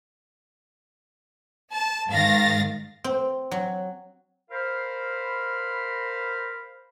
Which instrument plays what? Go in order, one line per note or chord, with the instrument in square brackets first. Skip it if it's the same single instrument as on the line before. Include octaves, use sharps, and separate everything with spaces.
[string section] A5
G#2 D#3 F5 A6 A#6
[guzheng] C4
F#3
[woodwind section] A#4 C5 F5 B5